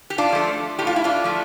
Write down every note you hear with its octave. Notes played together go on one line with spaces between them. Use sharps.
G4
D4 F4
F3 A3
A2 G4
F4
E4
D4 F4
F3 A3